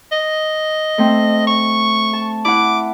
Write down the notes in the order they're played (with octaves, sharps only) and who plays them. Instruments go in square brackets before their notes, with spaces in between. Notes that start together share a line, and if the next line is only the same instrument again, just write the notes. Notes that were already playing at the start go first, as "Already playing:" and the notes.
[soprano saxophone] D#5
[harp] A3 C4
[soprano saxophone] C#6
[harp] A5
[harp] E4 F#5 [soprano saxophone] D6